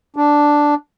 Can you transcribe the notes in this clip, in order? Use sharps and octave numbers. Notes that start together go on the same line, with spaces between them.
D4